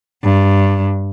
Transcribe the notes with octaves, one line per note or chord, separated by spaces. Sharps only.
G2